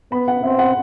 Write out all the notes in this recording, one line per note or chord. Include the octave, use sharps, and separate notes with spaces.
B3 B5
F#5
C4 E5
F#5